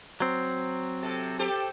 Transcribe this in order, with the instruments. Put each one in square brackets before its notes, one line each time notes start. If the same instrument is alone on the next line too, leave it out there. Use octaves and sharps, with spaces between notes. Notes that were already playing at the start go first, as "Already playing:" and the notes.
[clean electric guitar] F#3 C4
[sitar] C3 A4
G4 A4 C5